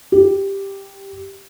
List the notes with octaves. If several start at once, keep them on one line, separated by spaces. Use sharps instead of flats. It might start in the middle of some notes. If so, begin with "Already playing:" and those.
G4